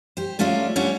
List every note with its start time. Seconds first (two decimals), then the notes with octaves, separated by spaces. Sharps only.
0.17 G4 C5
0.39 F#3 A3 C#4 F4 G4 D5
0.76 G3 C#4 D4 E4 C#5 F#5